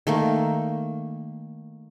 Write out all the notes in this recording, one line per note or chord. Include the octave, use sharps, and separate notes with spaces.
D#3 A3 A#3